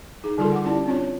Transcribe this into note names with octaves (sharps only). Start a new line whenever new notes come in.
D#4 G#4
D3 G3 F4 A4 A#4 C6
F#5 D6
C#4 E4 G4 D5 A5
C4 D4 F4 C#5